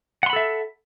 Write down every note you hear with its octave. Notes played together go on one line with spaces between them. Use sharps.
A4 E5 F#5 B5 C6